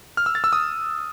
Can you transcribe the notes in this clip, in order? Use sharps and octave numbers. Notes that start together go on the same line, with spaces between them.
F6
E6
A6
E6
D#6